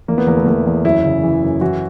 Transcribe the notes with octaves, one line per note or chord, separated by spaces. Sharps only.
E2 A#3
B3
E2 A#3
A3
E2 A#3
E2
F#2 E4
C#3
E3
F#2
E3 F#4